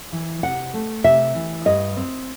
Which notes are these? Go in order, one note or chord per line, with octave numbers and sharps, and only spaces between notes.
E3
C3 F#5
A3
C3 E5
E3
G2 D#5
C4